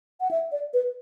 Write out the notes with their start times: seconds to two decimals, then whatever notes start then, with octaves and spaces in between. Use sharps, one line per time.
0.21 F#5
0.31 E5
0.52 D5
0.74 B4